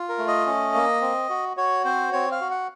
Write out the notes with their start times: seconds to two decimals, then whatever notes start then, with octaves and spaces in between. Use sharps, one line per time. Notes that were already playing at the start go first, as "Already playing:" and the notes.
Already playing: F4
0.09 A#4
0.18 A3
0.28 D#5
0.46 C#4
0.74 A#3
1.01 C4
1.29 F#4
1.57 F#4 C#5
1.85 C4 C5
2.12 C4 C#5
2.32 F5
2.41 F#4
2.51 F#5